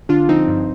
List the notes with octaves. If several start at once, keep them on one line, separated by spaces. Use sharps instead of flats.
D3 D4 F4
F3 C4 D#4
G2